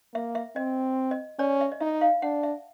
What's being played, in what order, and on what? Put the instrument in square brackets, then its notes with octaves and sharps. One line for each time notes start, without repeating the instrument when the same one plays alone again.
[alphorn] A#3 [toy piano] E5
[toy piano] E5
[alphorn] C4 [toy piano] D#5
[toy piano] D#5
[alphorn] C#4 [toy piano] D5
[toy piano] E5
D#5
[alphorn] D#4 [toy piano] E5
[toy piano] F5
[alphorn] D4 [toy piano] F#5
[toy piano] E5